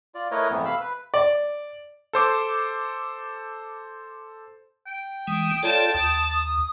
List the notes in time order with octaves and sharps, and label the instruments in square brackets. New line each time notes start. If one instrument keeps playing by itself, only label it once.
[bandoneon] F4 D5
A3 E4 A#4 B4 C#5 D#5
F2 G#2 E3 A3 B3
C3 F5 B5 E6
B4
[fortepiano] D5
[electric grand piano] A4 C5 D6
[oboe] G5
[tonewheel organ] E3 G#3 [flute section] D#6
[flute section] F4 [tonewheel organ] A4 C#5 D5 [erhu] A5
[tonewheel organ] D#2 [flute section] D#6
[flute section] D#6